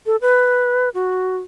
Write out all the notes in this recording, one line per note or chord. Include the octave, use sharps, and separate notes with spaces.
A4
B4
F#4